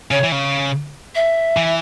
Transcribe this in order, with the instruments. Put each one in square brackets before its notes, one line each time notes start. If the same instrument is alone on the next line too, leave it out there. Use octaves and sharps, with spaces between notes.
[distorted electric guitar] C#3 [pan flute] C#5
[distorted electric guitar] E3
C#3
[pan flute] E5
[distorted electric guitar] E3